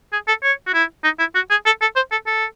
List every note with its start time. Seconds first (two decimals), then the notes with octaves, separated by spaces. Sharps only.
0.13 G#4
0.28 A4
0.43 C#5
0.67 F#4
0.74 E4
1.04 D#4
1.19 E4
1.35 F#4
1.50 G#4
1.66 A4
1.81 A4
1.96 C5
2.11 A4
2.27 A4